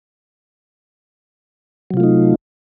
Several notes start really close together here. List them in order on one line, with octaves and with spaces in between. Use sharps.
F#3 C3 F4 A3 D#4